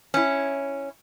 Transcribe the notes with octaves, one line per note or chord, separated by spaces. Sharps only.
C#4 E4